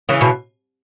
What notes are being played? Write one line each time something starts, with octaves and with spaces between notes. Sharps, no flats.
C#3 E3
B2